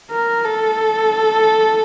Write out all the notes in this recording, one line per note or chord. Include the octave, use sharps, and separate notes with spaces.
A#4
A4